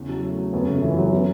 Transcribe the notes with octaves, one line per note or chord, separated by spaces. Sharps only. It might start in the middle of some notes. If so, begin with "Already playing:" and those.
Already playing: E2 C#3
F#3
A3
F#3
F#2 B3
C#3 A3
F#2 E3
F#2 F#3
C#3 B3